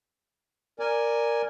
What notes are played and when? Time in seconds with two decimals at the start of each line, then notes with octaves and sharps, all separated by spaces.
0.79 A#4 D5 G#5